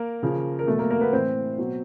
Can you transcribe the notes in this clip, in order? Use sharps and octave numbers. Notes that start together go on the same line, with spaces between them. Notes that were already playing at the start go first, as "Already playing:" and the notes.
Already playing: A#3 A#4
C#3 F3
A#4
B2 F#3 A3 A4
A#3 A#4
A#3 A#4
B3 B4
A2 E3 C4 C5
B2 F#3